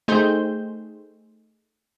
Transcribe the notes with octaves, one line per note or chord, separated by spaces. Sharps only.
A3 D#4 G#4 C5 G5 G6